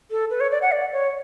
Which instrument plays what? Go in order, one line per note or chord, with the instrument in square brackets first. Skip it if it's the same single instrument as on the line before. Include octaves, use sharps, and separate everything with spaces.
[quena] A4
B4
C#5
D5
F#5
D5
C#5